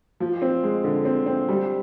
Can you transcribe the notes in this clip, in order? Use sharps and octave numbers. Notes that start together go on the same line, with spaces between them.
F3
C4
G#3
D3
C4
C4
G3